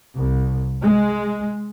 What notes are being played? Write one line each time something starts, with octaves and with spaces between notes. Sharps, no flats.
C2
G#3